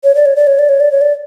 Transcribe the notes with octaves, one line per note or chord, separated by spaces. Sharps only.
C#5
D5
C#5
D5
C#5
D5
C#5
D5
C#5
D5